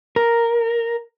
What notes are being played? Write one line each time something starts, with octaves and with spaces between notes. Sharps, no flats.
A#4